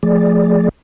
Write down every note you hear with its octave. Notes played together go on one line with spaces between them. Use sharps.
F3 A3 G#4 D5